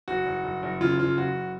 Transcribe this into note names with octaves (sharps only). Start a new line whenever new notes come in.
F#1 F#4
F#1
F#1
F#1
C#3 F4
F#1 F4
F#1 F#4